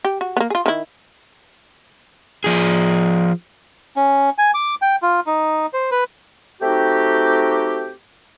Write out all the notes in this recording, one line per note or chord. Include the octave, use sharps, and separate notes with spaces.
G4
F#4
A#3 B3
F4 G#4
D#3 E4
F3 G#4
C#4
G#5
D6
G5
F4
D#4
C5
B4
A3 C4 D#4 F#4 G4